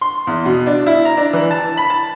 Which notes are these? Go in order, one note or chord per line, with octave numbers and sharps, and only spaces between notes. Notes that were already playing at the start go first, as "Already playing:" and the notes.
C6
E2
B2
D4
E4
A#5
D4
E3
A5
B5
A5